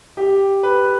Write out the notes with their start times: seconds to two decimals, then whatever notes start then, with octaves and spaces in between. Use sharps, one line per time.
0.17 G4
0.63 B4